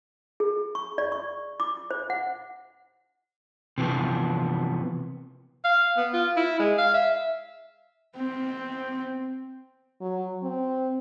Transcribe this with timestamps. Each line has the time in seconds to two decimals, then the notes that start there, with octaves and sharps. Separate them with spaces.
0.40 G#4
0.75 C#6
0.98 D5
1.12 C#6
1.60 D6
1.91 C5
2.10 F#5
3.78 C3 E3 F3 B3
5.64 F5
5.97 B3
6.13 F4
6.37 E4
6.59 G#3
6.78 F5
6.94 E5
8.17 C4
10.01 F#3
10.43 C4